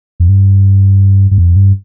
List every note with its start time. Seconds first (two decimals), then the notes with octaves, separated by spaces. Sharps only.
0.20 F2
0.29 G2
1.31 G2
1.38 F2
1.56 G2